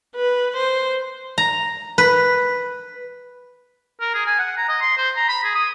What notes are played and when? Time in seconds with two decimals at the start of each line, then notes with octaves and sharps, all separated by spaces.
0.15 B4
0.57 C5
1.38 A#5
1.98 B4
4.00 A#4
4.14 G#4
4.26 G#5
4.39 F#5
4.57 A#5
4.69 D#5
4.81 C6
4.97 C5
5.16 A#5
5.28 B5
5.44 G#4
5.55 D#6